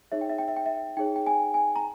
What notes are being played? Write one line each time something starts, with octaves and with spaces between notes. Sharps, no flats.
D#4 G#4 C#5 E5
G5
E5
G5
E5
G5
E5
D#4 G#4 C#5 G5
G5
G#5
G#5
A#5